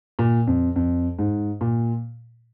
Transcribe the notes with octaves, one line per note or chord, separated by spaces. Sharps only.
A#2
F2
F2
G#2
A#2